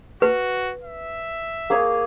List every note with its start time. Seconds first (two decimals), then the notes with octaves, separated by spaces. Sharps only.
0.22 F#4 B4
0.83 E5
1.70 A#3 G#4 C#5